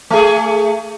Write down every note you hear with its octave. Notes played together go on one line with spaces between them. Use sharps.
A3 G#4